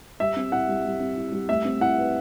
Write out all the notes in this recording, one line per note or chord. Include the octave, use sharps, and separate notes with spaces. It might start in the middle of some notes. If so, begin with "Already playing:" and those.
G3 E5
C4
E4 F#5
G3
G3
C4
E4
G3
A3 E5
C4
E4 F#5
B4